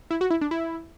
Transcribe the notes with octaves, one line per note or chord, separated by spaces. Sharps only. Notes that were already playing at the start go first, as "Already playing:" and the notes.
E4
F#4
E4
D4
E4